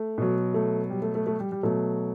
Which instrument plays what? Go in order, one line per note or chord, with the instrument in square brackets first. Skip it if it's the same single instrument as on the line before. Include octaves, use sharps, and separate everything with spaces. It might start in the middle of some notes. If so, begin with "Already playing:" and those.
Already playing: [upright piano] A3
B2 F#3
A3
G3
A3
A3
A3
G3
G3
B2 F#3 A3